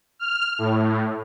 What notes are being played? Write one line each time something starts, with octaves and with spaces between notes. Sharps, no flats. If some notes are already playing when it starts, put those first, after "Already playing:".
F6
A2